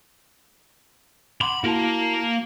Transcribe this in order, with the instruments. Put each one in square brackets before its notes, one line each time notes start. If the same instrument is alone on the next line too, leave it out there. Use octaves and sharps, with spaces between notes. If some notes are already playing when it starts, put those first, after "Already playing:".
[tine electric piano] F#5 C6 D6 [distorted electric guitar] B5
[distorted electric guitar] A#3 A#4 [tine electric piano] E4 F#4 A5